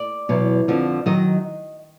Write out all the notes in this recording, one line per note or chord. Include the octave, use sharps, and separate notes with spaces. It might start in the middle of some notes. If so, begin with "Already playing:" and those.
Already playing: D5
E2 B2 F#3
F2 D3 F3
D#3 F#3 D#5